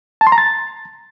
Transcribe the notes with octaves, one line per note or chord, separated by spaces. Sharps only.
A5
C6
A#5
A6